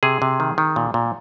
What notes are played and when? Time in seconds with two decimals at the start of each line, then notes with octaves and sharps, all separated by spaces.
0.03 C3 G#4
0.22 C3
0.40 D#3
0.58 D#3
0.76 A#2
0.94 A#2